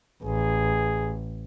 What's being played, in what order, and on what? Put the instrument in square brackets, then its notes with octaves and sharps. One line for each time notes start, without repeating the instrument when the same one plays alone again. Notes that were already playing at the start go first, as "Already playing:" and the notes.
[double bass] A1 [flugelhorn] G#4